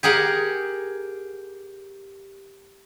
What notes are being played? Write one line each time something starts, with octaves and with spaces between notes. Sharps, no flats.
G4 G#4 A#4 F#5